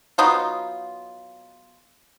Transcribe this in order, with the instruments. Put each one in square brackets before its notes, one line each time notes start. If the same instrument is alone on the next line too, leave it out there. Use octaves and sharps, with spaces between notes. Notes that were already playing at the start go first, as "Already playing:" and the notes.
[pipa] F#3 B3 D#4 F4